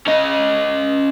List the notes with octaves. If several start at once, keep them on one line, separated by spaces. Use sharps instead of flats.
C#4 D#5